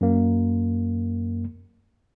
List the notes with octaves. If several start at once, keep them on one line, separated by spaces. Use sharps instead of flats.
F#2 A#3